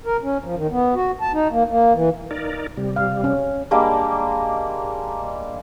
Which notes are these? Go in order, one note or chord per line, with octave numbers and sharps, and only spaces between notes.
A#4
C#4
F3
D#3
B3
F#4
A5
D#4
A#3
A#3
E3
D#4 A#4 D5
C3 G3
F5
C#4
G3 G#3 A#3 D4